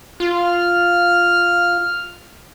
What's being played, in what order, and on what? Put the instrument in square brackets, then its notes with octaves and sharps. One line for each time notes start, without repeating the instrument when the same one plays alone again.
[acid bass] F4 [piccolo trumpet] F6